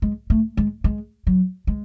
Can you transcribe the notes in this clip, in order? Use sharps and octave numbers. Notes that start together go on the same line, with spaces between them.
G#3
A3
G#3
G#3
F#3
G#3